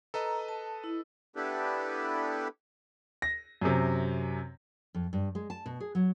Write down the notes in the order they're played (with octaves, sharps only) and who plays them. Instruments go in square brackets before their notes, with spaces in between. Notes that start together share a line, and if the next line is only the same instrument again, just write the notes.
[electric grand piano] A4 B4 D#5 [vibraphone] A#5
[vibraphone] A5
E4
[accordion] B3 D4 E4 G4 A4 B4
[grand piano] A#6
F#2 C3
[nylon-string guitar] F2
G2
G#3
A5
B2
G#4
F#3